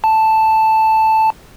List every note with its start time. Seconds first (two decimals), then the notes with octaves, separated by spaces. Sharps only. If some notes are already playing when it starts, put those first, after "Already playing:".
0.04 A5